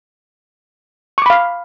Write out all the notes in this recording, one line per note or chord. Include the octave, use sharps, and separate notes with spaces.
F5 B5 C#6 D6